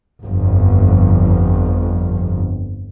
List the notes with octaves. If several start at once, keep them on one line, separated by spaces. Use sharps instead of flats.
G1 F2